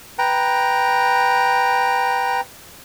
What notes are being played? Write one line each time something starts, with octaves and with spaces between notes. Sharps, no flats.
B4 G5 A#5